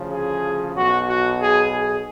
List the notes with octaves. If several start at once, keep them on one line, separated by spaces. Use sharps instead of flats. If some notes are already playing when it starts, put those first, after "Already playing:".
Already playing: D2 C#3 F3
G#4
B1 B2 F#4
F#4
G#4
G#4